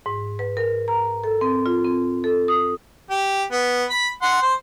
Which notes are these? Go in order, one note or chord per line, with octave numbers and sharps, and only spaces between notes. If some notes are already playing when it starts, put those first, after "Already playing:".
G#2
B4
A#4
A#5
A4
C4
F4
C4
A4
D#6
G4
B3
B5
F#5 C6
C5